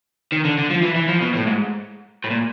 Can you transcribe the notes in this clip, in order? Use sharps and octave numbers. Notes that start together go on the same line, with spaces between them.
D#3
D3
D3
F3
E3
E3
F3
B2
A2
G#2
A2
A#2